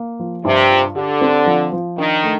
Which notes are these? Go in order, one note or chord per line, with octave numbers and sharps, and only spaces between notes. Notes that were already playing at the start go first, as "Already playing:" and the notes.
Already playing: A#3
F3
G2 C3
F4
D3 G4
C4
F3
F3
D#3 D4
A3